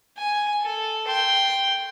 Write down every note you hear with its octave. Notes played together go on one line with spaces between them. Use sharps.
G#5
A4
G5 C6